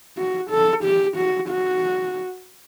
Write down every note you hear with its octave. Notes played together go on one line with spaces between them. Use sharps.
F#4
A4
G4
F#4
F#4